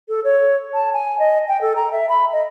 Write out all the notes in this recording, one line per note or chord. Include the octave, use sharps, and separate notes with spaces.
A4
C#5
A5
G#5
D#5
G5
A4
A#5
E5
B5
D#5